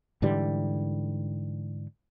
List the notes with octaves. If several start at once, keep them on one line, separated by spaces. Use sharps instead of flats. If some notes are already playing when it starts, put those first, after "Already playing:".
G#2 D3 E3 G3